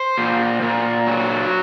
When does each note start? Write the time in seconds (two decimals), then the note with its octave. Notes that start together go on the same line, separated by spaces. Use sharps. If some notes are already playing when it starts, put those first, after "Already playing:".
Already playing: C5
0.18 A#2
0.62 A#2
1.07 F#3